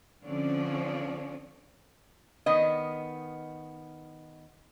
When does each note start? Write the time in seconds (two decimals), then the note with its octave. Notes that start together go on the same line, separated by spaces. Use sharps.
0.25 D3 F3 C4 C#4 C#5 D5
2.46 D#3 B3 D#5